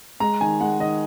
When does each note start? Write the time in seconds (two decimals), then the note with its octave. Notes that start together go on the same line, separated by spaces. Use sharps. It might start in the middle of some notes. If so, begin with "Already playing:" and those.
0.20 G#3 A#5
0.41 D#3 G#5
0.60 G#3 F#5
0.80 D#3 D#5